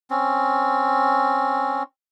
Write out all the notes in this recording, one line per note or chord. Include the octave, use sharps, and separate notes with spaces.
C4 C#4